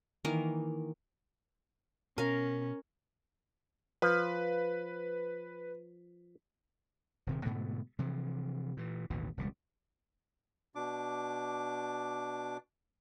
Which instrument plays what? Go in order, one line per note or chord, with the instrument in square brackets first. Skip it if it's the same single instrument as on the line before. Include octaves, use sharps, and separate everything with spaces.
[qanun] D#3 E3 A#3 A#4
[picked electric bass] B2 [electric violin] C#4 [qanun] A#4 F5
[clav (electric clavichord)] F3 [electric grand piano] B4
[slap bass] D#1 C3 D#3
G#2 B2 D3 A3
C3 E3 F3
A#2 E3
A1 D#2 B2 E3
E1 C#2 G3
[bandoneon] B2 D4 D6